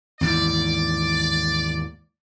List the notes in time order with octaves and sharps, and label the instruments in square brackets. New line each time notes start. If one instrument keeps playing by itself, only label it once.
[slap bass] D#2 G#2 E3 [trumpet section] D5